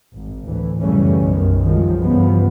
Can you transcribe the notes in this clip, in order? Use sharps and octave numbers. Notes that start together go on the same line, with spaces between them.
G#1
D2 A2 E3
F#2 C#3 E3 G3 A3 C#4
B1 F#2 D#3
C2 D#3 F3 F#3 G#3
C2 G2 C#3 E3 F3 B3